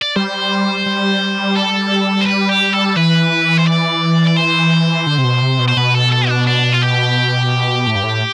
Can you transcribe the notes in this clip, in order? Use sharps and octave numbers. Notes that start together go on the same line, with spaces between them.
D5
G3 C5
G3
A4
C5
B4
G4
A4
E3 B4
C5
D5
D5
C5
D3
C3
B2
C3
B2
C5
B2 B4
A4
A4
D4
D4
F4
G4
A2
G2
A2